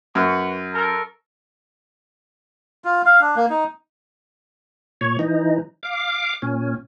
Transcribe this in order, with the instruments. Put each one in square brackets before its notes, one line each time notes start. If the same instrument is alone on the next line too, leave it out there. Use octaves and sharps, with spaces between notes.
[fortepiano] F#2 [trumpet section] B4 F#5 C#6
[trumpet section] A4 A#4
[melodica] F4
F5
D4
A#3
D#4
[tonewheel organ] A#2 C#5
E3 D#4
F5 D6
A#2 C#4